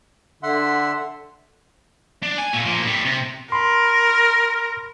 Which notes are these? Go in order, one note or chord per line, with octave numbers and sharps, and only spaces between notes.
D3 E5 F#5 C6
D4
G#5
A#2 A3
F3 A#3
A2 G3
C3
A#4 B5 C6